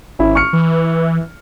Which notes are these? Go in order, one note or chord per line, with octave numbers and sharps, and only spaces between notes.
G#1 C#4 E4
C#6 F6 C#7
E3